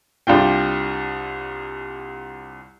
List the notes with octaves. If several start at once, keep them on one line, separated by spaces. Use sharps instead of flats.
C2 D4 F4 G5